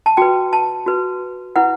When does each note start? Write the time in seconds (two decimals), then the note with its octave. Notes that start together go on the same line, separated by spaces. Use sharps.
0.06 A5
0.17 F#4 B4 G5
0.53 A5
0.86 F#4 B4
1.56 E4 B4 F#5